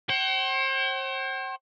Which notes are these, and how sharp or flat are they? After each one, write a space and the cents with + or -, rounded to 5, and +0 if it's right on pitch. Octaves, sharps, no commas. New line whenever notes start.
C5 +40 G5 -45